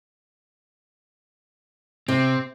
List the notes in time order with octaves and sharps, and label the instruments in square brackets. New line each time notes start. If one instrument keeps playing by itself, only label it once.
[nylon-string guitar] C3 [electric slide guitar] C4